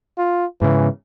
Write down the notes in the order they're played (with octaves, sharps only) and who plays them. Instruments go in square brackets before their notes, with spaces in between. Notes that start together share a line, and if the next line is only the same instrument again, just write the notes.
[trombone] F4
[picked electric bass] G#2 C#3 [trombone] E3